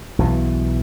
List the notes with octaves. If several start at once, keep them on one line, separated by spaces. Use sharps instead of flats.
B1 B2 E3